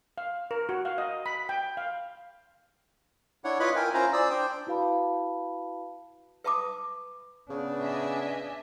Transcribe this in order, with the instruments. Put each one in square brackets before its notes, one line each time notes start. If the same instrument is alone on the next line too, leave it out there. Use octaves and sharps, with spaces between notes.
[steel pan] F5
A#4
F#4
F5
D#5
B5
G5
F5
[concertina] D4 E4 C#5 F#5
E4 F4 B4 C#5 D#5 B5
E4 A#4 G5 G#5
C#4 E4 F4 C5 A#5
C5 D5 D#6 E6
D4 C5 G5
[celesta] E4 F#4 B4 F5 A5 B5
[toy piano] B4 E5 A5 B5 D6 D#6
[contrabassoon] C#3 [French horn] B3 [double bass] D4
[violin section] D#5 E5 G#5